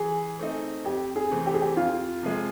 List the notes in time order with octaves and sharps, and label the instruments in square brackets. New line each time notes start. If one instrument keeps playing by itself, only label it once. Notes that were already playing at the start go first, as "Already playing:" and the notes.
Already playing: [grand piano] E3 [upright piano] G#4
[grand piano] A3 C4 D#4
[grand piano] F2 [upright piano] G4
[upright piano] G#4
[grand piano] C3 E3 A3 C4
[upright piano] G4
G#4
G4
[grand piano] F2 [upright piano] F4
[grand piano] C3 F3 G#3